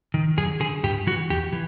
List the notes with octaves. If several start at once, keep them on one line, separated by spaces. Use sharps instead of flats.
D#3
F#2 G#4
D3 G#4
G2 G4
E3 F#4
E2 G4
E3